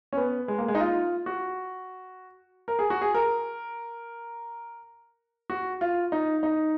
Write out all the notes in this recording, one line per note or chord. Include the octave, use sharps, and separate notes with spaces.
C#4
B3
G#3
A#3
G#3
D#4
F4
F#4
A#4
G#4
F#4
G#4
A#4
F#4
F4
D#4
D#4